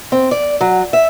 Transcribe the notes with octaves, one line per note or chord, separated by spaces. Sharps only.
C4
D5
F#3
E5